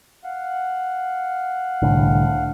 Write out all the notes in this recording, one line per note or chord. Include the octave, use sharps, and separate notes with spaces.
F5 F#5
C2 A2 D3